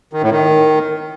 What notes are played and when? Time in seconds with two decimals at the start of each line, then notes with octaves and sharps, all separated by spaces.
0.13 D#3
0.22 A2
0.31 D#3